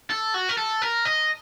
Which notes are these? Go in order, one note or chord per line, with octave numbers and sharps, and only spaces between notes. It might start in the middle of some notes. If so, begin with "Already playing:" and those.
A4
F#4
A#4
A4
A#4
D#5